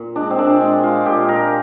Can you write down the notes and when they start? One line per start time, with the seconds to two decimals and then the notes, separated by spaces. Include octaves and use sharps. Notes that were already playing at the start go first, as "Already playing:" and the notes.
Already playing: A#2
0.16 G#3 D4
0.30 C4
0.38 A#2 D4
0.61 G#3
0.83 G#3 F4
1.05 A#2 G4
1.28 A#2 A#4